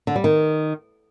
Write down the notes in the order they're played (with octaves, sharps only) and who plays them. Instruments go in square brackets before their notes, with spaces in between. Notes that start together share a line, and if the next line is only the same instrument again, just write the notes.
[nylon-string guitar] D3
G3
D#3